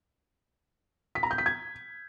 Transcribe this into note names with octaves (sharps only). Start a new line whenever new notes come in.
B6
A#5
G6
B6
G#6